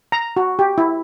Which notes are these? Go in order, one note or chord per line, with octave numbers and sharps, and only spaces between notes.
A#5
F#4
G4
E4